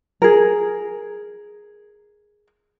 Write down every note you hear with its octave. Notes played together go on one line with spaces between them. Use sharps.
G#4 A#4